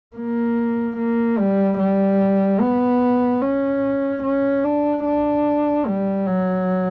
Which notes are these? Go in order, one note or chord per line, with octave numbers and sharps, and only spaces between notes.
A#3
A#3
G3
G3
B3
C#4
C#4
D4
D4
G3
F#3